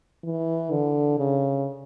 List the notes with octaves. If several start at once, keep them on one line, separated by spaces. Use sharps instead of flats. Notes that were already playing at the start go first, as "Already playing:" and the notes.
E3
D3
C#3